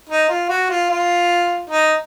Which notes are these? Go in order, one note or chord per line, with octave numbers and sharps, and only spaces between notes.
D#4
F4
F#4
F4
F4
D#4